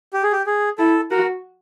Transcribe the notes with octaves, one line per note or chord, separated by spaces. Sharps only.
G4
G#4
G4
G#4
E4 A4
F#4 A#4